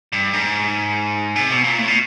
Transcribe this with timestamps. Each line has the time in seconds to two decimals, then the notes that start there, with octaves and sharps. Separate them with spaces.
0.12 G2
0.33 G#2
1.36 C3
1.50 B2
1.64 A#2
1.78 A2
1.88 B2